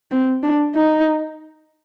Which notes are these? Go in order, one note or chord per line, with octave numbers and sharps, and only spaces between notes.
C4
D4
D#4